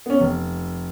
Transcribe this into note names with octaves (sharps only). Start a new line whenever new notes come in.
B3 C#4
F1